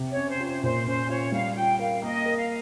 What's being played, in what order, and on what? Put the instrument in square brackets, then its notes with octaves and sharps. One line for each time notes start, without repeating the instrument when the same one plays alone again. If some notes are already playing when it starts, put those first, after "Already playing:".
Already playing: [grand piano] C3 G4
[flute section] C#5
[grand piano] C#4
[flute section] C5
[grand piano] F4
[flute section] C5
[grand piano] A#2 [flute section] C5
[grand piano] C#4 [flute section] C5
[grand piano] F4 [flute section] C#5
[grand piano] G3 [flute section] F5
[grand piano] F4 [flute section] G5
[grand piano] A#4 [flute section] F5
[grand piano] A#3 [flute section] D#5
[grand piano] A#4
[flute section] F5